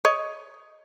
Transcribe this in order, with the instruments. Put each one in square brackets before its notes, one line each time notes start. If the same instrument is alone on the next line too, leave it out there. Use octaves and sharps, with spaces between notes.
[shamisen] C#5 D#5